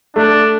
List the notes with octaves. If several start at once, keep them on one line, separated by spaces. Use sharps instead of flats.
A3 D4